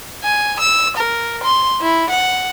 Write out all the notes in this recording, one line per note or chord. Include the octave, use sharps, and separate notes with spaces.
G#5
E6
A#4
C6
E4
F#5